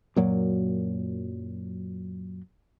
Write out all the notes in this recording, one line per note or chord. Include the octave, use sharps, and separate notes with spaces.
F#2 A#2 F#3